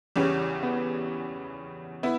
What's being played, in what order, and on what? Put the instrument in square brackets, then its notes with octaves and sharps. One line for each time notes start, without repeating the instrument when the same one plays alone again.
[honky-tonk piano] E2 C#3 E3 G3 [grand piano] C#4
[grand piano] B3
[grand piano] B3 [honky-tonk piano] E4